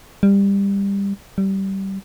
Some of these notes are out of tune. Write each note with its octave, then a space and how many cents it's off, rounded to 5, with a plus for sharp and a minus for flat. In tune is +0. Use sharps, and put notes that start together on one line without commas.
G3 +20
G3 -20